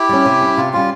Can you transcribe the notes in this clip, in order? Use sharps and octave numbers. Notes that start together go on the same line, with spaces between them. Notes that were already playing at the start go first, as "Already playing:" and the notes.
Already playing: E4 G4
G3 C#4
C3
G3 C#4
C3 F4
G3 C#4 F4